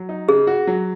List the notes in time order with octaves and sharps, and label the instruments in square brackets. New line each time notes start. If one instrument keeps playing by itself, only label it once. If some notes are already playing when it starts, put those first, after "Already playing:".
Already playing: [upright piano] F#3
D#4
[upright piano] C#3 [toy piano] G#4
[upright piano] F#4
F#3